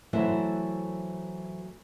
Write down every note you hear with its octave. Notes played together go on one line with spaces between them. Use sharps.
E3 F#3 A3 C5 E5